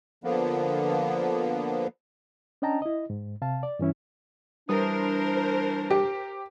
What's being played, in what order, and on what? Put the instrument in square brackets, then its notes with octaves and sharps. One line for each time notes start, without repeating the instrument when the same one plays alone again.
[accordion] D3 F3 A#3 B3
[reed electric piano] C#4 D4 D#5 G5 A5 A#5
E4 D#5
G#2
C3 F5 A5
D5
G2 E3 C#4 E4
[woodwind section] E3 D4 [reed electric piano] G3 D#6 [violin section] A#4 C5
[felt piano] G4